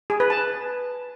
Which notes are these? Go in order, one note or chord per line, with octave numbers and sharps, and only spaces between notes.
G#4
B4
A5